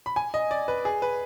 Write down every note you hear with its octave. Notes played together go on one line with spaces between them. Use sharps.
B5
G#5
D#5
D5
B4
G#4
B4